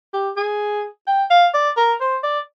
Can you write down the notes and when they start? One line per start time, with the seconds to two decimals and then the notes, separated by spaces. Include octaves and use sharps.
0.13 G4
0.37 G#4
1.07 G5
1.30 F5
1.54 D5
1.77 A#4
2.01 C5
2.23 D5